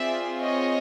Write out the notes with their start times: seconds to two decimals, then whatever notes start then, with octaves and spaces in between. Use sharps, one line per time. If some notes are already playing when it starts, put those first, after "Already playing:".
Already playing: C4 F4 G#4 D5 E5
0.40 C#5 D#5